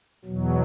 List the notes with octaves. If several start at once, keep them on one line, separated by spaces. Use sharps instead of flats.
E2 B2 F#3